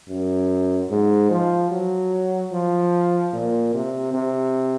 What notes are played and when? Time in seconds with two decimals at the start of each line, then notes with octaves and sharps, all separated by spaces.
0.08 F#2
0.90 G#2
1.31 F3
1.71 F#3
2.52 F3
3.33 A#2
3.74 C3
4.14 C3